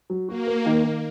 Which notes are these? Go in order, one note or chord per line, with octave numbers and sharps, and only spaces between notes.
F#3
A#3 F#4
A#4
D#3
D#3